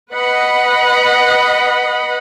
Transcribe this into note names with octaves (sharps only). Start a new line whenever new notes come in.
B4 D#5 F#5 B5